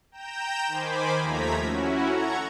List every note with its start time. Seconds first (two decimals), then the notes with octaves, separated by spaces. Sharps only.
0.12 G5 A#5 G6 E7
0.68 D#3 C5 G#5 B5 D6
1.19 D#2 F3 A3 A#5 G#6 B6
1.61 C#4 E4 F#4
2.08 A4 F#5 A#5 C#6 G#6